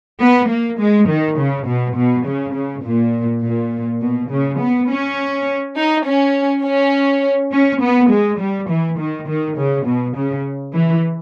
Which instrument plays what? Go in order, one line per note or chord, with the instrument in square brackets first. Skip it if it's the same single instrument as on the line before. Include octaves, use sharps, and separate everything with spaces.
[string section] B3
A#3
G#3
D#3
C#3
B2
B2
C#3
C#3
A#2
A#2
B2
C#3
B3
C#4
D#4
C#4
C#4
C#4
B3
G#3
G3
E3
D#3
D#3
C#3
B2
C#3
E3